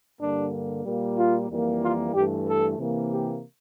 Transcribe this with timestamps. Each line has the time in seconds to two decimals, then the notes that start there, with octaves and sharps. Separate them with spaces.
0.20 G2 D3 G3 A#3 D4
0.85 A#2 G3 A#3
1.17 F4
1.50 F2 E3 G3 A#3
1.81 F4
2.14 G2 E3 A3 G4
2.46 A4
2.78 C3 E3 A#3
3.11 G4